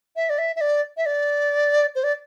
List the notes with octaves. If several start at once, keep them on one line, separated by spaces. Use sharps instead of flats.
E5
D5
E5
E5
D5
E5
D5
C5
D5